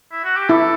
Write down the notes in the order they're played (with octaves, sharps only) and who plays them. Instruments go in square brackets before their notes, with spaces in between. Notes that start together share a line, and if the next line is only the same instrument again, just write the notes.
[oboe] E4
F#4
G4
[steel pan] E4 [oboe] A4